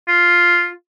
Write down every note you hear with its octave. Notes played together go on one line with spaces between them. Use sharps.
F4